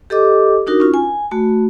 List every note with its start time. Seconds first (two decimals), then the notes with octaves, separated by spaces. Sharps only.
0.10 G4 A4 D#5 D6
0.67 D4 D#4 F#4 A#4
0.80 C#4 F4
0.94 G#5
1.31 A3 F#4